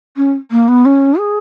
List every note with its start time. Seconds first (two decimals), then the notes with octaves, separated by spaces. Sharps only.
0.17 C#4
0.51 A#3
0.68 B3
0.85 C#4
1.18 G#4